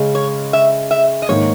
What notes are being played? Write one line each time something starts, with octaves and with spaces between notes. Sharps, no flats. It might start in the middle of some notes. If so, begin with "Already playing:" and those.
Already playing: C#3 G#3 C#4
C#5
E5
E5
D#5
G#2 D#3 A#3 C#5